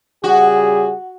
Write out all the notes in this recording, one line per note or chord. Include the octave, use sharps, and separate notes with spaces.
C#3 G3 F#4 G#4